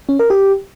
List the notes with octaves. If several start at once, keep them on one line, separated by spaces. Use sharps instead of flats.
C#4
A#4
G4